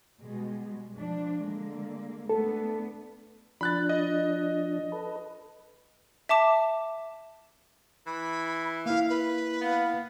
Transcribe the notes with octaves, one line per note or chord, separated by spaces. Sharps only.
B2 G3 G#3
F3 D4
D3 G#3 A#3
A3 B3 D4 A4
F3 D4 B5 F#6 A6
D#5
A4 B4
E5 A5 D6 E7
E3 B5
A#3 E4 F5
B4
B3 F5